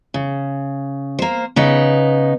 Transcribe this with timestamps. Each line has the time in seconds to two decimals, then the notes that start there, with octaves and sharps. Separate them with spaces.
0.14 C#3
1.19 A#3 C5
1.56 C#3 B3 D#4